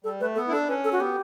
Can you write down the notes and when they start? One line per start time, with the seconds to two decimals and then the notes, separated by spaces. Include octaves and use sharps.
0.04 G3 A4
0.21 A3 B4
0.35 B3 A4
0.48 E4
0.51 D4 A4
0.68 C#4 B4
0.84 A4
0.92 F#4
1.00 B3 G4